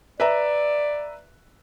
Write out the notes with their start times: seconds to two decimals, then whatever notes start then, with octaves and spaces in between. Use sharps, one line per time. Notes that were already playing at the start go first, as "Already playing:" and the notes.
0.20 B4 D5 E5 A#5